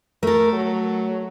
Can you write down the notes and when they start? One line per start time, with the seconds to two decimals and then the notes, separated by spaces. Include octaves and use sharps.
0.23 A3 A4 A#4
0.53 F#3